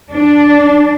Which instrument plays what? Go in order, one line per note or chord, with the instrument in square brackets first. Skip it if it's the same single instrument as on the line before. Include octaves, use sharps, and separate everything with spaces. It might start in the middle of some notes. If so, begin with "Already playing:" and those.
[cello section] D4